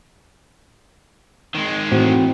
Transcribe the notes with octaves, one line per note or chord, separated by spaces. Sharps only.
D#3 G#3
A2 E3 C4 F#4